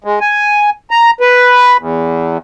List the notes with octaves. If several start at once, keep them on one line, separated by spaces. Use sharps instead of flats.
G#3
G#5
A#5
B4
E2